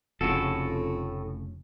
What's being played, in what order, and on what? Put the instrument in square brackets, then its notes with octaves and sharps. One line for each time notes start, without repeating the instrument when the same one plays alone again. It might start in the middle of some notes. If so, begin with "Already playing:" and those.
[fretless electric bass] F1 C#3 [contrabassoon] F2 [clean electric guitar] A2 F#4 A4